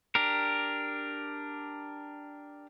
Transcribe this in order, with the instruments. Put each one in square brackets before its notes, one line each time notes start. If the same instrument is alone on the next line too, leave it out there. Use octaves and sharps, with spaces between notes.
[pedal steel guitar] D4 G4 A#4